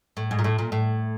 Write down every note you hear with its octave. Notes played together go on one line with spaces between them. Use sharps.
A2
G#2
A#2
A2
A#2
A2